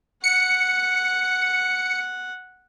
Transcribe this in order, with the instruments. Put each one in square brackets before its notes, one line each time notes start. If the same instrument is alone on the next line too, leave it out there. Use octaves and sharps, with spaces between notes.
[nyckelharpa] F#5 [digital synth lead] C#7